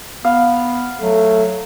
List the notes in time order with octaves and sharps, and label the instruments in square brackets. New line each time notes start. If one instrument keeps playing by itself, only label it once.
[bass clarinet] B3 [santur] F5
[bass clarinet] F#3 [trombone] A3